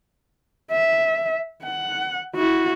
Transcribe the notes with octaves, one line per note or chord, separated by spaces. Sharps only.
E5
F#5
E4 F#4